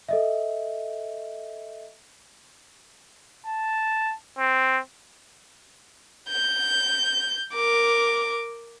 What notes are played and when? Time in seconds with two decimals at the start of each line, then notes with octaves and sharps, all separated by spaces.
0.09 A4 D#5 E5
3.46 A5
4.39 C4
6.29 G6
7.53 A#4 D6